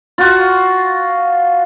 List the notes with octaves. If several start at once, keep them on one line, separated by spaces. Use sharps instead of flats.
F4 F#4